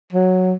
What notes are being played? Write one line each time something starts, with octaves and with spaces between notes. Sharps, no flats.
F#3